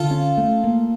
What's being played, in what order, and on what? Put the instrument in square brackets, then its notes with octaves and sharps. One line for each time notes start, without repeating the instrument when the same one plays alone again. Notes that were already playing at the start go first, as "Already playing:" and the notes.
Already playing: [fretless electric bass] D3 [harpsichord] F4 A4
[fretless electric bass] C#4
A3
A#3